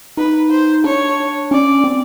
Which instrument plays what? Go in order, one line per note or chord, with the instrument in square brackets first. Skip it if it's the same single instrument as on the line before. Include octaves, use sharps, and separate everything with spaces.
[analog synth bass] D#4 [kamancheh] B4
[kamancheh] C5
[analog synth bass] D4 [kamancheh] C#5
[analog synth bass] C#4 [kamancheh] D5
[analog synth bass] C4